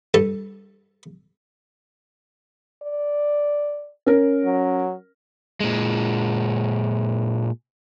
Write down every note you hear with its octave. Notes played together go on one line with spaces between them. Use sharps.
G2 A4 A5
D5
C#4 A#4
F#3
A#2 G#3